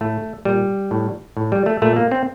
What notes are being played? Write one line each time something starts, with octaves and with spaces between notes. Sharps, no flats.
A2 A3
A#2 G3
A2
A2
G3
A3
A#2 A3
A#3
C4